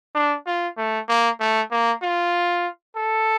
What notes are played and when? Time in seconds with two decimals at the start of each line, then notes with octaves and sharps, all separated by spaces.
0.15 D4
0.46 F4
0.78 A3
1.08 A#3
1.40 A3
1.71 A#3
2.02 F4
2.96 A4